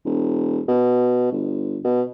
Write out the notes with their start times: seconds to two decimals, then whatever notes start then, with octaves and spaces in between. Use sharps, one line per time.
0.05 E1
0.68 B2
1.32 G1
1.84 B2